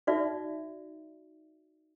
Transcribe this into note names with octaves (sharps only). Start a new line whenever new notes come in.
D#4 F#4 D5 E5